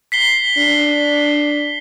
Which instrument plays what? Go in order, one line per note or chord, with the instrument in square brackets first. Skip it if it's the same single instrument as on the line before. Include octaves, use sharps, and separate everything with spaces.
[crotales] B6 C7 G7
[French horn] D4